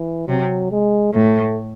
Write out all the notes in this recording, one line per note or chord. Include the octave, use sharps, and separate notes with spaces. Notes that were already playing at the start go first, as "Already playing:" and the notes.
Already playing: E3
C3 F#3
G#3
A2 A3